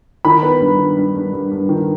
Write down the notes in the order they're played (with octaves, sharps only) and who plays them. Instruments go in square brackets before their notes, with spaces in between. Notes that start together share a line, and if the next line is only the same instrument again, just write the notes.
[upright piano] D#3 B5
B3
G2
D#3
G2
G2
G2
G2
D#3